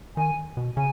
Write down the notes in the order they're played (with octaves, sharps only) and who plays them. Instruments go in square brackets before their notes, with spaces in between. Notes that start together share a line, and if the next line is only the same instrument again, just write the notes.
[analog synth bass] D#3 [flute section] G#5
[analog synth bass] B2
[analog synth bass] C#3 [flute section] G#5